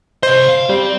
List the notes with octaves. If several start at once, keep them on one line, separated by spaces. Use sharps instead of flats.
C3 C5 D#5
F5
G3 C4 C5